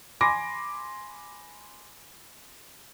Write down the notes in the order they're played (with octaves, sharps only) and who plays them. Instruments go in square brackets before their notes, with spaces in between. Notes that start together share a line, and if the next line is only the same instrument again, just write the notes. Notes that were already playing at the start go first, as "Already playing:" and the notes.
[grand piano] G#5 B5 C6 D6 A#6